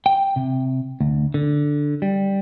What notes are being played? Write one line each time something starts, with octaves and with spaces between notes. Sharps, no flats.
G5
C3
D2
D3
G3